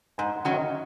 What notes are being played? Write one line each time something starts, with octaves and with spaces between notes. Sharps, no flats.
G#2 G#5
F#5
D#3 F#3 C#4
D#5